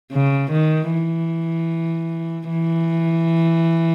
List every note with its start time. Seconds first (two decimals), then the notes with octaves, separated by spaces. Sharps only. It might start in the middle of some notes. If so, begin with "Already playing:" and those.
0.12 C#3
0.52 D#3
0.91 E3
2.50 E3